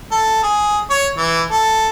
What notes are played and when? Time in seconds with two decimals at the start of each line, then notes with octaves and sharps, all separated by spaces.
0.12 A4
0.43 G#4
0.90 C#5
1.17 E3
1.51 A4